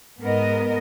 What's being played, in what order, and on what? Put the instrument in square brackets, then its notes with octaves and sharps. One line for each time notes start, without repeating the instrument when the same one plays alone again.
[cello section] G#2 B3 A#4 D#5